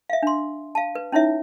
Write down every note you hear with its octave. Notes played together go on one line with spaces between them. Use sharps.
E5 F5
D4 C6
F5 A5
B4
C#4 D#4 E4 C#5 E5